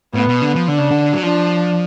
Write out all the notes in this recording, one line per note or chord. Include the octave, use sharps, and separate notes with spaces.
A2 B3
B2
D3
F3
D3 D4
C#3
D3
F#3
F3 D4